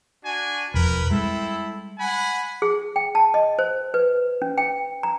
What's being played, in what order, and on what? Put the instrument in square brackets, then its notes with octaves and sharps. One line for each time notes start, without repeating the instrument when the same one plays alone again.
[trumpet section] D4 F#4 G#5
[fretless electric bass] E1 F2 [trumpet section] A#4 B4 B5
[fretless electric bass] G3 G#3 [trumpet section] C4 E4 A4
[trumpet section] F#5 G#5 B5
[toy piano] G#4
G5
A5
D#5
C5
B4
C#4
G5
A#5